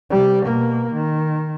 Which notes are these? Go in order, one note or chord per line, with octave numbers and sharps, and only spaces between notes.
C3 G3
B2 A#3
D#3